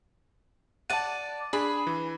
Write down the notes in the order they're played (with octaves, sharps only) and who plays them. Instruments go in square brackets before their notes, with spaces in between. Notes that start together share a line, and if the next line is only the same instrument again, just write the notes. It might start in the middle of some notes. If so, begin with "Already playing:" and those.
[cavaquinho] D5 F#5 [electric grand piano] A5 D#7
[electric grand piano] D4 G#4 [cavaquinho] B5
[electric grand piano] E3